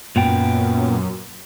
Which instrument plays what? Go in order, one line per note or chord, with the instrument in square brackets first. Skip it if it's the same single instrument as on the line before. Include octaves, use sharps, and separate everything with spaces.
[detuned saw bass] F#2 [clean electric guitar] A#2 B3 G5